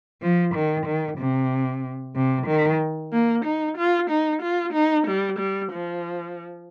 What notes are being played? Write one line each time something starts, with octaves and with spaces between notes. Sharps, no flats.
F3
D#3
D#3
C3
C3
D#3
A#3
D#4
F4
D#4
F4
D#4
G3
G3
F3